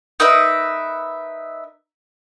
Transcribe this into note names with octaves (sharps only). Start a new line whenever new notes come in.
D#4 A#4 B4 E5